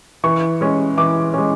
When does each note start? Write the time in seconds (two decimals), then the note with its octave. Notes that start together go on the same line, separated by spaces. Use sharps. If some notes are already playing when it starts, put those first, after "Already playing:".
0.24 E3 C#6
0.61 G#3 C#4
0.97 E3 D6
1.34 G#3 C#4